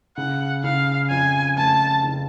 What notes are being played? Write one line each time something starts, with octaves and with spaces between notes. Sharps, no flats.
C#3 F#5
C#3 F5
F2 G#5
F1 A5
C#3